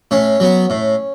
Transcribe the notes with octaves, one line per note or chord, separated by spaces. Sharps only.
A2 C#4
F#3 B3
A2